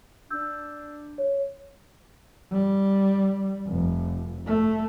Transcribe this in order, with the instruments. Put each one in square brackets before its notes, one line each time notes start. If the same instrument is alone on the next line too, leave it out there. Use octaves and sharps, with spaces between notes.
[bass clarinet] D4 [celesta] E6 G6
[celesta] C#5
[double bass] G3
F1
A3